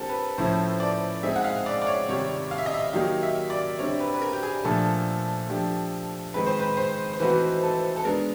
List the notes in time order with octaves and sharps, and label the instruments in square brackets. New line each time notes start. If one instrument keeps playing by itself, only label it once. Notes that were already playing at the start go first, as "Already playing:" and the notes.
Already playing: [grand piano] D3 G3 C4 F4 [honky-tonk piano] A4 A#4
[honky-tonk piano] B4
[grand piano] A2 F3 A3 C#4 E4 [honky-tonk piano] C5
[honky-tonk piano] D5
[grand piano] G#3 C4 D#4 G#4 [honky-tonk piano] E5
[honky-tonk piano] F#5
F5
D5
D5
C#5
[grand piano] C3 D#3 G3 [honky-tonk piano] C#5
[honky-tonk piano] F5
E5
D#5
E5
[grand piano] D#3 F#3 A#3 D#4 G4 [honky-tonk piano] F5
[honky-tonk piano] E5
D5
[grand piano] D3 G3 C4 [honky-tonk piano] C#5
[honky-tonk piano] B4
B4
A#4
G4
G#4
[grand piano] A#2 F3 A3 D4 [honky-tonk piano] A4
[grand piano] F3 A3 D4 G4
[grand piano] D#3 G#3 C4 [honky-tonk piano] B4
[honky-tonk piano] C5
B4
C5
C5
[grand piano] E3 A3 C4 D#4 F#4 [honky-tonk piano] B4
[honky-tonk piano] A4
A4
[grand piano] G#3 B3 D4 [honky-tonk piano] A#4